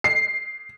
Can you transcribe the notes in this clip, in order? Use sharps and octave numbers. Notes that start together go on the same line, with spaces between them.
C7